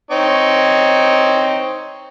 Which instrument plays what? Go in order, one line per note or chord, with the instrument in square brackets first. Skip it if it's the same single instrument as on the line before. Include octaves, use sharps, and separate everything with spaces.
[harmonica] C4 D#4 C#5